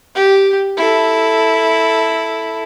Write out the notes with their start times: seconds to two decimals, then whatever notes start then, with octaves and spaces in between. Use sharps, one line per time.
0.15 G4
0.77 E4 A4